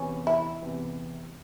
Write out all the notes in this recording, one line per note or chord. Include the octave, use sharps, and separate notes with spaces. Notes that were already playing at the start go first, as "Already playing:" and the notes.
Already playing: E2 C3 E3 C#4
E4
E2 C3 E3